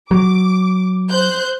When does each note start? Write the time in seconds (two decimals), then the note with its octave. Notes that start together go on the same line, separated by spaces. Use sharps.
0.11 F#3 D6
1.10 C5 F#6 G6